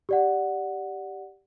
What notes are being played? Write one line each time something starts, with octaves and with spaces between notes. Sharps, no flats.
G4 D5 F#5